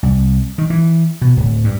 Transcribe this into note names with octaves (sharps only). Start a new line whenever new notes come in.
C2
D#3
E3
B2
D1
G2